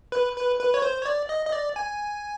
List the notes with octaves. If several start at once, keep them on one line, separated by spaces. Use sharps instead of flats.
B4
B4
B4
C#5
C5
C#5
D5
D#5
D#5
D5
G#5